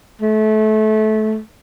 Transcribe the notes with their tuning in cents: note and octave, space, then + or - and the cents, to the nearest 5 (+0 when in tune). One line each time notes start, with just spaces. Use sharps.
A3 -25